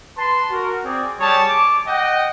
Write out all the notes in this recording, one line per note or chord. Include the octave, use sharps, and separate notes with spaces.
B4 A5 C6
F#4 A#4
C4 G#4 D5
G3 G#4 C#5 A5
D6
D#5 F#5 G5